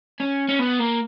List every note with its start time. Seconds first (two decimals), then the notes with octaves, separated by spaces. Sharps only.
0.20 C#4
0.49 C#4
0.59 B3
0.80 A#3